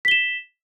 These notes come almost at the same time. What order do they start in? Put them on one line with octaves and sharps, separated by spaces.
B6 G7 E7